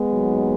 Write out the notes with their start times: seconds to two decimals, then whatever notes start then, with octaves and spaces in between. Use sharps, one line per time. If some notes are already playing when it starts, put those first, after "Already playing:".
Already playing: G#3 B3
0.11 D#2 D#3 F#3